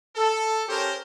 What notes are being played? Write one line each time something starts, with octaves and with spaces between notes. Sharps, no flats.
A4
C#4 G4 A4 A#4 C5